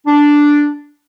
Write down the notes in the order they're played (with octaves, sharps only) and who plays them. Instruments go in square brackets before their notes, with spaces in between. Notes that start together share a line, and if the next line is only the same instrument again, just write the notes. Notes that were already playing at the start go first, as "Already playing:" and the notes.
[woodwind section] D4